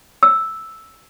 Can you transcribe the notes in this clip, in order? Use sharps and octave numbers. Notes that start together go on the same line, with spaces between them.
E6